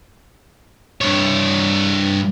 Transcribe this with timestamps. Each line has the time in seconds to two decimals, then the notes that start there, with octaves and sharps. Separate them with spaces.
1.01 G2 C#5